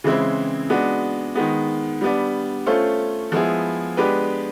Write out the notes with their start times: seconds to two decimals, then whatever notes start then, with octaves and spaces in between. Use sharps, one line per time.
0.04 C#3 E3 G#3 C4 E4
0.70 G#3 B3 D4 F#4
1.35 D#3 G#3 B3
2.01 G3 B3 D4
2.66 A3 C#4 F4 A4 C5
3.32 F3 G#3 B3 E4 G#4
3.97 G#3 B3 D4 G4 B4